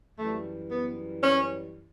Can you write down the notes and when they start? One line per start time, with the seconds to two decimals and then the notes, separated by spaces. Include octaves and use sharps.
0.17 F#2 E3 G3 A3
0.70 B3
1.23 C#4